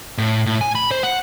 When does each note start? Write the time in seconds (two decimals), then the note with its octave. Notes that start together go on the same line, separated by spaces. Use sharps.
0.18 A2
0.46 A2
0.61 G#5
0.75 B5
0.91 C5
1.03 F#5